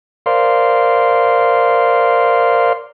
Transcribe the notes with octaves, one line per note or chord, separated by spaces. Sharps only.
A#4 C5 D5 F5 C6